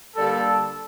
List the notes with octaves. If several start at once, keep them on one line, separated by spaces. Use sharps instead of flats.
D3 G3 A#3 A4